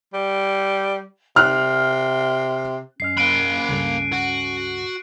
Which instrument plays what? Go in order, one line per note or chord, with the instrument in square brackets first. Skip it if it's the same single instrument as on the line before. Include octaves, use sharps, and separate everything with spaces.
[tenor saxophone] G3
[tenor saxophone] C3 [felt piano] F6 F#6
[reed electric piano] F#2 D#5 F6 [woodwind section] C#4 [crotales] C7
[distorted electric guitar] A#3 B5 [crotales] F#6 D7 D#7
[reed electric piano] C#2 G2 A4
[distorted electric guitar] F#4